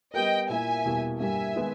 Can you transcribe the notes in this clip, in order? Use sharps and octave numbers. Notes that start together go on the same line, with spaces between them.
G3 B3 G4 A#4 D#5 G5
A#2 A#3 E4 E5 G#5
E2 B2 G3 A#3
G2 G3 A#3 E5 G#5
D#3 G#3 B3 D#4